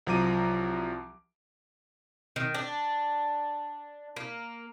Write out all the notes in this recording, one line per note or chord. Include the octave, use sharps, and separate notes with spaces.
C2 F3 F#3 A#5 D6 D#7
D#3
D4
A#3